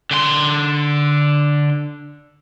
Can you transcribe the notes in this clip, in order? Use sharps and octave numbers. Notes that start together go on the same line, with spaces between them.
D3 C6